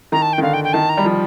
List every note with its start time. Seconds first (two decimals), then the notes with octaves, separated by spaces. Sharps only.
0.12 D#3 A#5
0.22 A5
0.33 G5
0.38 D#3
0.42 D3 F5
0.53 G5
0.64 G5
0.73 D#3 A5
0.89 A#5
0.97 G3
1.05 F3